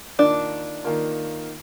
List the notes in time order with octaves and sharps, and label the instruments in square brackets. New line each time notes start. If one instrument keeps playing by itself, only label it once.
[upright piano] D#3 A#3 F4 [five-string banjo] D4
[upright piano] D#3 A#3 F4